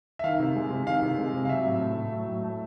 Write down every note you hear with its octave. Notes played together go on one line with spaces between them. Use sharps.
E5
D#3 F5
C3
G#3
C3
D#3 F5
C3
G#3
C3
F5
F#3 E5
A2
A3
A2
F#3
A2
A3